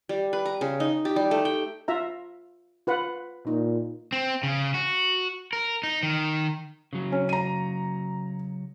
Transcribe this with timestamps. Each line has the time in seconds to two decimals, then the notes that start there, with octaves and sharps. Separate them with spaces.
0.09 G3
0.33 B4
0.45 A#5
0.61 C#3
0.80 D#4
1.05 G4
1.16 G3
1.31 A3
1.45 G5
1.88 F4 E5 A#5
2.87 F4 B4 F#5
3.47 A#2 D#4
4.13 C4
4.43 C#3
4.74 F#4
5.53 A#4
5.83 D#4
6.03 D#3
6.93 C#3 F#3
7.12 C#4
7.29 A#5 D#7